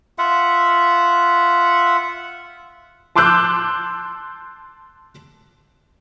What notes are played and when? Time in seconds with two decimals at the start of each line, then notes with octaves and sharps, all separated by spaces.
0.18 F4 E5 F#5
3.16 A5 C6 D6 E6 F#6 G6